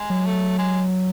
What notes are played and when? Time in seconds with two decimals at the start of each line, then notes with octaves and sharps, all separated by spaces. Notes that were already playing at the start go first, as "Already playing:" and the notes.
Already playing: G#3
0.10 F#3
0.27 A3
0.58 G#3